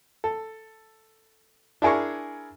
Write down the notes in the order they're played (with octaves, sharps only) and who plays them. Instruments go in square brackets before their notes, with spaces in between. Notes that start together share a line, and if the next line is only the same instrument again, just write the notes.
[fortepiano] A4
D4 E4 G#4 A#4 C#6